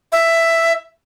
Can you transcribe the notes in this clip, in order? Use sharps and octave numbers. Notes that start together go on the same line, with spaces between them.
E5